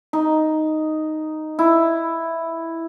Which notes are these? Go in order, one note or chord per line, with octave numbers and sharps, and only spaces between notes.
D#4
E4